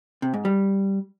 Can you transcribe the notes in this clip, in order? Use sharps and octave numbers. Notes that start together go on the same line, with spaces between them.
C3
G#2
G3